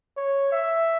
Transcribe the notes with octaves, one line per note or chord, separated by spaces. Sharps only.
C#5
E5